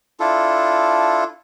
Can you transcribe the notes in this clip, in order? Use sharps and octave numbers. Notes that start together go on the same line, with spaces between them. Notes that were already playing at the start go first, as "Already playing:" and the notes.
D4 E4 F4 A4